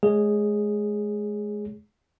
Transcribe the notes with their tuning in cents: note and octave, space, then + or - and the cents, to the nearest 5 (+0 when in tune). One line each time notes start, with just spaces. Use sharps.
G#3 +25 G#4 -5 C#5 +25